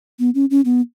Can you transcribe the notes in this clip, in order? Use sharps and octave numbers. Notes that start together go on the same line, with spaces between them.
B3
C#4
C#4
B3